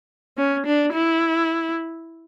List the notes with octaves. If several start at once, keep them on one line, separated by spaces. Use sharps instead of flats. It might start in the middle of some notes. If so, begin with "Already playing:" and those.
C#4
D4
E4